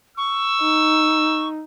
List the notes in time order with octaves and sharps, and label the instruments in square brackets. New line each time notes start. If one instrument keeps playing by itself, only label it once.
[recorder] C#6 [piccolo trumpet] E6
[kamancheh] D#4